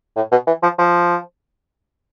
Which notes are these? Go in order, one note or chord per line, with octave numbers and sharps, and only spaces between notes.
A2
B2
E3
F3
F3